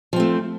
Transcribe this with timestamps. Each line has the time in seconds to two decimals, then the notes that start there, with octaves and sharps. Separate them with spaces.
0.13 F3
0.16 C4
0.20 A3